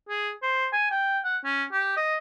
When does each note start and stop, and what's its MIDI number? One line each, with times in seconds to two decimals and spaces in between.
0.09 0.31 68
0.42 0.66 72
0.73 0.87 80
0.91 1.19 79
1.24 1.37 78
1.44 1.64 61
1.72 1.96 67
1.97 2.16 75